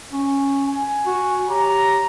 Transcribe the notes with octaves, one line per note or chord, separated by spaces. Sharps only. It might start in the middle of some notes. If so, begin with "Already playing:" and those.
C#4
G#5
F#4
G4 C#5 A#5